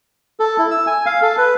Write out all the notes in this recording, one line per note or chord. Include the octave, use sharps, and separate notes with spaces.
A4
E4
E6
G#5
F5
A4
B4